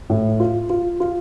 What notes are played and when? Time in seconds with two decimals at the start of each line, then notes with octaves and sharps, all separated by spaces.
0.10 A2
0.40 F4
0.70 F4
1.00 F4